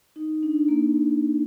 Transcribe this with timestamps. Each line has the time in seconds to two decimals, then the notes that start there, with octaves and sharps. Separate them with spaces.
0.16 D#4
0.43 D4
0.69 A#3